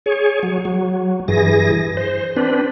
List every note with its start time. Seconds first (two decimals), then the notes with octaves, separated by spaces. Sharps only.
0.06 G#4 C#5
0.43 F#3
0.65 F#3
1.28 G2 E3 G#4 A#6
1.97 C5
2.37 C4 D4 B4